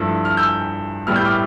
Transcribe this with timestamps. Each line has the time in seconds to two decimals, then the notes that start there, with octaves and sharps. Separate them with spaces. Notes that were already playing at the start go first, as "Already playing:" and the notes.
Already playing: G2 F3 A3 E4
0.25 F6
0.37 E6 G6
1.07 A2 G3 B3 E4 F6
1.16 G6
1.25 D6 F6